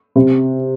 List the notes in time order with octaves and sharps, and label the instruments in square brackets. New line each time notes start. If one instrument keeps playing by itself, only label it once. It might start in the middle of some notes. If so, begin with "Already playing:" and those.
[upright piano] C3